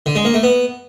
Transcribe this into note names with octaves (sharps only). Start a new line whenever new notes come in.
D3
G#3
A#3
A3
B3